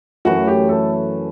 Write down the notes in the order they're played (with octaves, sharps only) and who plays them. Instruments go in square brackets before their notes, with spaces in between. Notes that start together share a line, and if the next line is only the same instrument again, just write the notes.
[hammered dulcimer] F#2 E3 A3 [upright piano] F#4
[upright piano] G4
A4